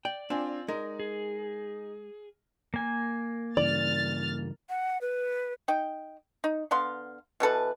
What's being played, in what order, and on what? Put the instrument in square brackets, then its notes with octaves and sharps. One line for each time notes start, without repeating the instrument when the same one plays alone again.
[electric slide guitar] D5 [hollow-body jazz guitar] G5
[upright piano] C4 F4 G#5 [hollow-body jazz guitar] D4
[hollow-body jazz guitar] G#3 A#4 [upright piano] D#4
[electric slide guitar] G#4
[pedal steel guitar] A#3 G#5
[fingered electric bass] G2 C#3 E3 [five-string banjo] D5 [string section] F6 A6
[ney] F#5
B4
[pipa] D#4 G5
D#4
D3 B3 F5 C6
B2 E3 A4 B4